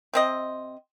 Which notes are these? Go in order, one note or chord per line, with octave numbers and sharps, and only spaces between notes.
C3 C4 D#5